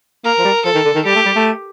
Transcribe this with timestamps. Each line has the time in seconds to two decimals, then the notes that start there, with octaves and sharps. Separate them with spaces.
0.25 A#3 A#4
0.39 F3
0.45 G3
0.65 F3 A4
0.75 D#3
0.85 D3
0.95 D#3
1.05 G3 G4
1.15 A3
1.25 G3
1.36 A3